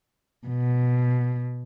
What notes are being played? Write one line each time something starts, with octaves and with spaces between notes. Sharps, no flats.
B2